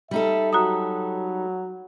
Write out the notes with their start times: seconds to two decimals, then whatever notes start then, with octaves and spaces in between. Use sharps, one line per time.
0.11 G3 D#4 A4 E5
0.53 F#3 F#4 A#5 D#6